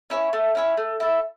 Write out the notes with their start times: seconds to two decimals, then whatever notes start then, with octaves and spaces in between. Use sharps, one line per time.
0.10 C#4 E4 C#5
0.33 A3
0.55 C#4 E4 C#5
0.77 A3
1.00 E4 A4